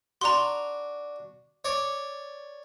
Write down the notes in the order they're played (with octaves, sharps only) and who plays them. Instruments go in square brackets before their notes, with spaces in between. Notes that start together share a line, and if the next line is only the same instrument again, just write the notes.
[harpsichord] D4 F#4 [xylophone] A#5 C6
[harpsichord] C#5 D5